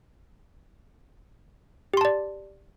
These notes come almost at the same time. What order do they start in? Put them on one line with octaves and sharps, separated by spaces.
G4 C6 A5 D5